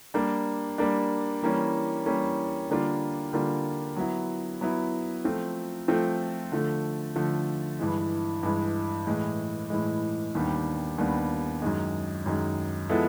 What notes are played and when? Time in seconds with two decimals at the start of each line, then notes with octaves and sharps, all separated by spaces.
0.14 G3 A#3 D4
0.78 G3 A#3 D4
1.42 E3 G3 A#3 C#4
2.06 E3 G3 A#3 C#4
2.69 D3 G3 A#3 D4 F4
3.33 D3 G3 A#3 D4 F4
3.96 F#3 B3 E4
4.61 F#3 B3 E4
5.25 F3 A3 C4 F4
5.88 F3 A3 C4 F4
6.52 D3 F3 A3
7.16 D3 F3 A3
7.79 G2 E3 G#3
8.43 G2 E3 G#3
9.07 A2 E3 G#3
9.70 A2 E3 G#3
10.35 D#2 D#3 G3 B3 D4
10.98 D#2 D#3 G3 B3 D4
11.62 F#2 D#3 G#3
12.26 F#2 D#3 G#3
12.90 F3 G#3 B3 E4 A4